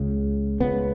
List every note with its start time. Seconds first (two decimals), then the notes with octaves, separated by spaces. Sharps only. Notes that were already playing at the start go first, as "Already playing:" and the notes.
Already playing: C#2 C#3
0.60 C#2 C#3 B3